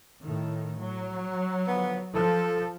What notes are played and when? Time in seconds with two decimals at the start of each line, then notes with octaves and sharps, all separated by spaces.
0.24 A2 D#3
0.82 F#3
1.68 D3 F3 B3
2.14 F3 A4